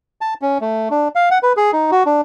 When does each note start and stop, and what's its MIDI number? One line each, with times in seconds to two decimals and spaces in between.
0.21 0.34 81
0.42 0.58 61
0.61 0.89 57
0.91 1.08 62
1.15 1.29 77
1.31 1.38 78
1.43 1.53 71
1.57 1.71 68
1.73 1.91 63
1.91 2.03 66
2.06 2.21 62